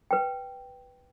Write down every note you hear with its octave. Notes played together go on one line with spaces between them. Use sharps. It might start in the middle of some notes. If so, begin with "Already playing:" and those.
B4 G5